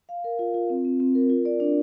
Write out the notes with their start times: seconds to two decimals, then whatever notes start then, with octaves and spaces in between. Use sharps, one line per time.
0.09 F5
0.24 A#4
0.39 F4
0.54 F4
0.70 C4
0.85 C4
1.00 C4
1.15 A#4
1.30 F4
1.45 D5
1.60 D4